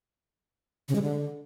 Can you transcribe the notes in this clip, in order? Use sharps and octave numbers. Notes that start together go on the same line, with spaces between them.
C#3
G#3
D3